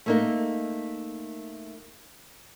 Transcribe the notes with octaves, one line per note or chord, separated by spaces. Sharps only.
A3 A#3 D#4